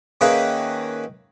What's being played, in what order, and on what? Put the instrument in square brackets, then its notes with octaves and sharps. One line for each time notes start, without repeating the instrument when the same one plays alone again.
[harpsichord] D#3 A#3 C#4 G#4 B4 E5